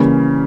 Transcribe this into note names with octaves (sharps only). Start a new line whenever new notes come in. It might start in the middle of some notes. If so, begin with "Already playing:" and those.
Already playing: C#3 E3 G3 A#3 C#4